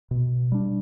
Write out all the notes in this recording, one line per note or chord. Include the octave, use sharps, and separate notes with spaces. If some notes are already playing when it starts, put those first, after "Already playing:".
B2
G3 D4